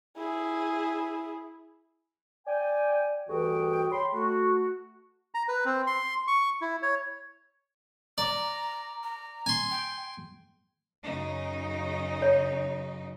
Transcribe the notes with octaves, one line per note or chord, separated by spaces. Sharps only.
E4 G#4
D5 G5 G#5
D2 G2 E3 F#4 G#4 G5
C#5 G5 B5 C6
A3 F#4
A#5
B4
C4
C6
C#6
E4
C#5
D5 A#5
A#5
G#5 C6
G5
F#2 C#3 D#4
C#5